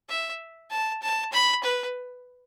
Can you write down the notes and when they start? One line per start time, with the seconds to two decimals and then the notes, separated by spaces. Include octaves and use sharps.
0.09 E5
0.71 A5
1.02 A5
1.32 B5
1.63 B4